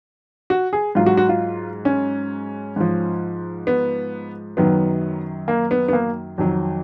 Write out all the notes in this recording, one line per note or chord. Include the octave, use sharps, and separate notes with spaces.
F#4
G#4
G#2 F#3 F4
F#4
F#4
F4
C#4
G#2 F3
B3
F#2 D#3 F#3 B3
A#3
B3
B3
A#3
F2 D#3 F#3